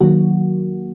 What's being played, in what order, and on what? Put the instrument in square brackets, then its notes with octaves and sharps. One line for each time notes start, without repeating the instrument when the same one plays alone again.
[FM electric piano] D#3 F#3 A#3 F#4